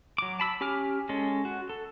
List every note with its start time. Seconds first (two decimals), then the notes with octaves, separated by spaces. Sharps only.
0.18 F#3 D6
0.40 A5 B5 E6
0.61 C#4 G4 G#5 D6 F6
1.09 G#3 C#4 A4
1.45 F#4
1.69 A4